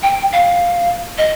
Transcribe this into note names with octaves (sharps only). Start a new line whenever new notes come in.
G5
F5
D#5